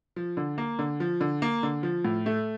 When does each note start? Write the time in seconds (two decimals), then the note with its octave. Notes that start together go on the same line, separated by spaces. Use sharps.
0.16 F3
0.37 D3
0.58 A#3
0.79 D3
1.00 F3
1.21 D3
1.42 A#3
1.63 D3
1.83 F3
2.05 A2
2.26 A3